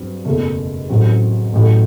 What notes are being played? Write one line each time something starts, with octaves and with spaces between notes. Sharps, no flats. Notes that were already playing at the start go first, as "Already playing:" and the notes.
Already playing: G2 F#3 C4
F#1 E2 B2 A3
A1 A2 F#3 C4
A1 A2 F#3